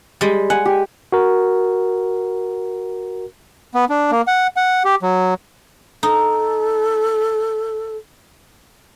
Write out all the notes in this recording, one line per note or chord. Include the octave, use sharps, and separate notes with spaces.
G3 G#3
F#5 G#5
G4
F#4 A#4
B3
D4
A#3
F#5
F#5
G4
F#3
D#4 A4